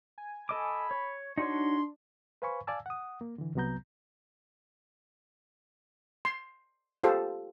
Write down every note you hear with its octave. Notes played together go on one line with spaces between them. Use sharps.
G#5
A4 D#5 B5 D6
C#5
D4 D#4 F#4 C#5 C6
B4 C5 F5 G#5 B5 C#6
D5 F5 G#5 A5 E6
F#5 D#6
A#3
D3 E3
C2 C3 F#3 B3 A#5 G6
C6
F4 G4 A4 C5